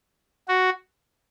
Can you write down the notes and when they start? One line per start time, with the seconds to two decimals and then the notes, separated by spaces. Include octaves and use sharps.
0.48 F#4